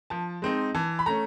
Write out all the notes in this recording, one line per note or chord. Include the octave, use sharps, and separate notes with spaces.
F3 A5
G#3 C4 D#4
E3 A5
B5
A3 C#4 A#5